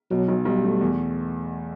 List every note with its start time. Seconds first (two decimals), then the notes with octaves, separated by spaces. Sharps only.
0.11 B2 F#3
0.28 B1
0.45 B1 G3
0.64 A3
0.81 E2